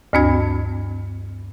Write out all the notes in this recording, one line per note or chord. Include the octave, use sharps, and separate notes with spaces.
D2 G2 C4 D4 F#4 G#6